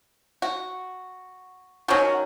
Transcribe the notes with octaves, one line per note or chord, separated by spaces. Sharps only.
F#4
D#3 F#3 C#4 F#4